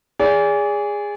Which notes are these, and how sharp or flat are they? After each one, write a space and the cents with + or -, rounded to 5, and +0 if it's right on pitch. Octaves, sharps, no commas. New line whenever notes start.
G#4 -15 D5 -35